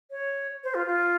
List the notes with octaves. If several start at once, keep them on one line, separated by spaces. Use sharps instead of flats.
C#5
C5
F4
F4